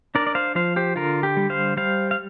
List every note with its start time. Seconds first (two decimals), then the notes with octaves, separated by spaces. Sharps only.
0.15 D4 A#4 D5
0.27 D5
0.35 C5 F5
0.55 F3 C5 F5
0.76 G4 C5
0.96 D3 F4 A#4
1.23 G4
1.37 G3
1.50 C5 F5
1.77 G3 C5 F5
2.11 F5